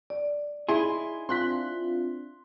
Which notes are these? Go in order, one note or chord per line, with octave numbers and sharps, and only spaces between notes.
D5
D#4 E4 G#4 C6
C4 D4 F4 C6 F#6 B6